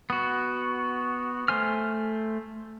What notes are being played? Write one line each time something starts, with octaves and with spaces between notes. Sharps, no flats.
B3 F#4
A3 C5 G#5 F6